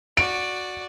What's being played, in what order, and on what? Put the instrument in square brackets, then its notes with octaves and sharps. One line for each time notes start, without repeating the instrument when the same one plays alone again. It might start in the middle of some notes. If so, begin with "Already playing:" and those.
[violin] F#4 D5 [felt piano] D7